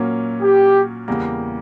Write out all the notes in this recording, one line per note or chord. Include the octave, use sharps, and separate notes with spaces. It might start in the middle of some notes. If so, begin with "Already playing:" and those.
Already playing: A#2 F#3 A#3 C#4
G4
E2 C#3 G3 A#3